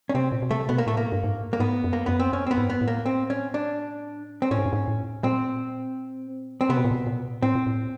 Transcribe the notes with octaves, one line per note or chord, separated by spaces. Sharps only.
C#4
C3 C4
A#2
B2
C3 A3
B2 B3
A#3
A2 A3
A#3
G2
G#2
A#3
G#2 B3
F#2
A#3
F#2 B3
C4
F#2 C#4
C4
B3
G#2
B3
A2
A#3
C4
C#4
D4
C4
A2 C#4
G#2
G2
G#2
A2
A#2 C4
C4
C3 B3
B2
A#2
B2
A#2
A2 C4
A#2
A2